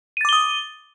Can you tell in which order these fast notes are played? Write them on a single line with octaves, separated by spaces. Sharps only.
D#7 A6 D6 G7 D#6